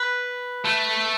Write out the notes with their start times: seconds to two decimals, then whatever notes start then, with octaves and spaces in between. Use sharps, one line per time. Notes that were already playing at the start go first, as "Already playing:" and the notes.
Already playing: B4
0.65 A3